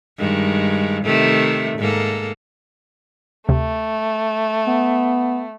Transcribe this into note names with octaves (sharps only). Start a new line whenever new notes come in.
G2 D#3 G#3
C3 D#3 A3
G#2 A#3 A4
D2 C3 A3
B3